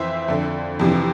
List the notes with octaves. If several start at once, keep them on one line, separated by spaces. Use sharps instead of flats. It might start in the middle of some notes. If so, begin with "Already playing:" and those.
Already playing: F2 E3 C5 E5
F2 D3
F2 C3 E3